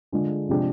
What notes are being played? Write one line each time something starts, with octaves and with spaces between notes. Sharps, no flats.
D3 G#3 D4 F4 G#4
C3 F3 G#3 D4 G4